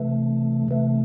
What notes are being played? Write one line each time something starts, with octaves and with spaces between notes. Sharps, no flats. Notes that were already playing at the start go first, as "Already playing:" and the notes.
Already playing: C3 E3 A3
C3 E3 A3